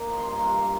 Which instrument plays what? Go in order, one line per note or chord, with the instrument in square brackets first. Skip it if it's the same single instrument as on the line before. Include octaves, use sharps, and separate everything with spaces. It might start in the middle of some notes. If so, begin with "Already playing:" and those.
Already playing: [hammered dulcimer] A#3 D#4
F3
C6
G2 A#5
G2 C6
A#3